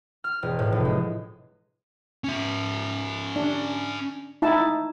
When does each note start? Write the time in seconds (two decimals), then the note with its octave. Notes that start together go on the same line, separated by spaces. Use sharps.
0.24 F6
0.43 E1
0.59 A2
0.72 F1
0.85 G#3
2.24 C#4 E5
3.36 D4
4.42 D#4 E4 A5